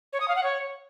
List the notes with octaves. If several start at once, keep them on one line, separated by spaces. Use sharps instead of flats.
C#5
D#6
F5
F#5
C#5